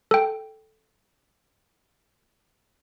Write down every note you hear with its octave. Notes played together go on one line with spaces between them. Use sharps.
A4 G5